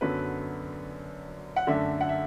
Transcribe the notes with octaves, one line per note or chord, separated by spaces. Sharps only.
F#2 D3 F#3 B3 B4
F#5
F#2 D3 A3 D4 E5
F#5
E5